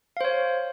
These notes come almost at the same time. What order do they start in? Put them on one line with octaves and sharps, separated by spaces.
F5 C5 C#5